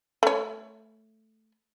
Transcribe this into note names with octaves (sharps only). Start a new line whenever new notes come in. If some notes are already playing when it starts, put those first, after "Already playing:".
A3 C#5